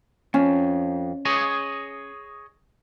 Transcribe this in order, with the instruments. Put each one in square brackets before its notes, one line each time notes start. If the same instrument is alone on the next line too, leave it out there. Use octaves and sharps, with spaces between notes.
[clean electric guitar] F2 [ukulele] C#4
[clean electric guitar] G#4 C#5 D#5